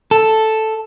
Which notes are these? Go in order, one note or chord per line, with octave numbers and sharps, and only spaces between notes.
A4